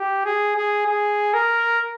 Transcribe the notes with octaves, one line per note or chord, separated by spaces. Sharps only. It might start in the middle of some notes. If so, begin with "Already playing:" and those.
Already playing: G4
G#4
G#4
G#4
A#4